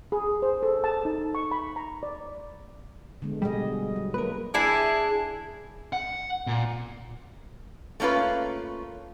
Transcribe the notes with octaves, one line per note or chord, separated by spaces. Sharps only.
G#4
C5
A4
A5
D#4
C#6
B5
A#5
D5
D3 G#3 B3
B2 G3 G#4 D#5
F#3
A#3 A#4 B4
D4 E4 G#4
F#5
A#2
A3 A#3 C#4 F4 B4